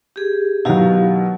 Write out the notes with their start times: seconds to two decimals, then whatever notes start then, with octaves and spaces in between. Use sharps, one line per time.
0.16 G4 G#4
0.65 B2 D#3 F#3 E4 G4 F5